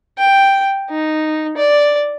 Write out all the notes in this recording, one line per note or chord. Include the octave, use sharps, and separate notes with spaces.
G5
D#4
D5